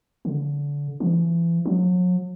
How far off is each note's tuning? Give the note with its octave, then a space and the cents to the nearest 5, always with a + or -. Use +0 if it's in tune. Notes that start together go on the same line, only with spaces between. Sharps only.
D3 -30
E3 +35
F#3 -40